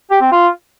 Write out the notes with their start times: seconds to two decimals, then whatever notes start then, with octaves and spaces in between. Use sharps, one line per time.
0.11 G4
0.21 C4
0.32 F4